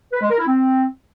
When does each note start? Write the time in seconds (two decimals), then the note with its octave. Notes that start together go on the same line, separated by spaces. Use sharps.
0.13 B4
0.21 G#3
0.30 A#4
0.38 E4
0.47 C4